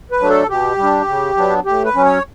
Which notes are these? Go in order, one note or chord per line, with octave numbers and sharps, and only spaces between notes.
B4
F#3 A3 D4
A4
B2 G4
G3
D4
C#3
F#3 B3 D4
A2 G4
B4
F#3 C#4
C#5